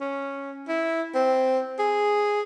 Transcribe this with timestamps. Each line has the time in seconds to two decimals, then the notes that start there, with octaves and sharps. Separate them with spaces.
0.01 C#4
0.68 E4
1.15 C4
1.79 G#4